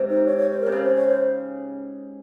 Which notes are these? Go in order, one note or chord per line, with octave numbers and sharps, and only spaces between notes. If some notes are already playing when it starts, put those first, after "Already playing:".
Already playing: G#2 C3
D#4
C#5
C#5
C5
A#4
C3
C#3 C5
C#5
C#5
C5